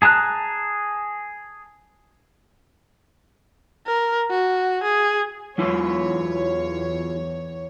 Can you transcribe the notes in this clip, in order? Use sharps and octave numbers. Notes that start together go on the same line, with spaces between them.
G#4 A5 A#5 F#6
A#4
F#4
G#4
E2 F#3 E4 F4 C#5